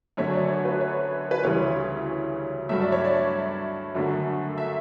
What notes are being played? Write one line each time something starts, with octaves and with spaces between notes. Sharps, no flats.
F#2 D3 F#3 A3 C#5
D5
C#5
B4
C#5
B4
D2 C#3 E3 G3 C#5
G2 F#3 A3 E5
D5
C#5
D5
F#2 D3 F#3 A3
E5